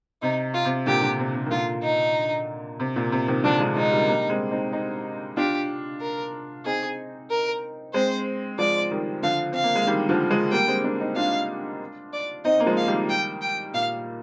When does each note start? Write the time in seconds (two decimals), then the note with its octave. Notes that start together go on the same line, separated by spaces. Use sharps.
0.22 C3 D#4
0.54 F4
0.65 C3
0.87 A#2 D3 G4
1.02 A#2 D3
1.19 C3
1.35 C3
1.46 D#3
1.51 A#2 D3 F4
1.83 D#4
2.80 C3
2.96 A#2
3.12 C3
3.28 C3 D#3
3.44 D3 F3 D4
3.60 F3 G#3
3.76 F3 G#3 D#4
3.92 D#3 G3
4.09 G3 A#3
4.30 G#3 C4
4.51 C4 D#4
4.72 C4 D#4
5.37 D4 F4 G4
6.01 A#4
6.65 C4 D#4 G#4
7.30 A#4
7.94 G#3 C4 C5
8.58 F3 G#3 D5
8.91 D#3 G3
9.23 D3 F3 F5
9.52 C4 F5
9.64 A#3
9.75 G#3
9.87 D#3 G3
10.09 D3 F3
10.30 F3 G#3
10.52 G3 A#3 G5
10.68 G#3 C4
10.84 A#3 D4
11.00 C4 D#4
11.16 D4 F4 F5
12.13 D5
12.45 C4 D#4 D#5
12.60 A#3
12.66 F3 G#3
12.77 F5
12.88 D#3 G3
13.10 G5
13.42 G5
13.74 A#2 F5